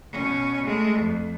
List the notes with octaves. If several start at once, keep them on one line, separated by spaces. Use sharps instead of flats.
B2 C#4
G#3 A3
F2